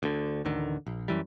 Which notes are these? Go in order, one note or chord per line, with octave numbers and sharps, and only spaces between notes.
D2 D3
A1 D2 D3 D#3
A#1
F#2 E3 G3